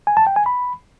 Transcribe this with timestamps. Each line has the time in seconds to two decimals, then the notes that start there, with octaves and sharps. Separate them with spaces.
0.07 G#5
0.17 A5
0.27 G5
0.36 G#5
0.46 B5